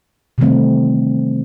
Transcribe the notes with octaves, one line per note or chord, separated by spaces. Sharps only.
C3 D#3 E3 G3 A3 C4